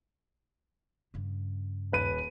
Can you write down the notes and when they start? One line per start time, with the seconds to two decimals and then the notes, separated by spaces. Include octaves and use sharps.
1.14 G2 C#3
1.92 D#1 B4 D#7